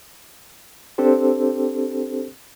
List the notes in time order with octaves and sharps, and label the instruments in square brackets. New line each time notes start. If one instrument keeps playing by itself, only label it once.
[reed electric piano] C4 D4 G4 A4 C5